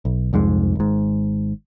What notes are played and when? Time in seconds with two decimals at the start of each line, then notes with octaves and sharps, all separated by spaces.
0.05 B1
0.33 C2 F2 G#2 G#3
0.75 G#1 G#2